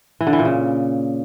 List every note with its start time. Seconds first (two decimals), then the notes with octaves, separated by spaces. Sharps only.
0.21 E3
0.27 D3
0.33 E3
0.39 A#2
0.45 C#3